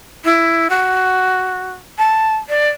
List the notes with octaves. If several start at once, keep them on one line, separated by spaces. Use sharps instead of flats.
E4
F#4
A5
D5